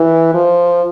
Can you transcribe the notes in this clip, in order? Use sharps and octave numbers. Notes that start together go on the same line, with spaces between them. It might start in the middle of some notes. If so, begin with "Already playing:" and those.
Already playing: E3
F3